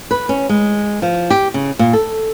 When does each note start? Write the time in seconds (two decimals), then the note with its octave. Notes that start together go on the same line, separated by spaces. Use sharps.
0.11 B4
0.29 C#4
0.49 G#3
1.02 F3
1.30 G4
1.54 C#3
1.79 A#2
1.93 A4